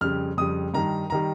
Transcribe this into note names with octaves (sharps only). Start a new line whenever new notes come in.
F2 C#3 G3 F6
F2 C#3 G3 D#6
G2 D#3 G3 A#5
D#3 G3 A#5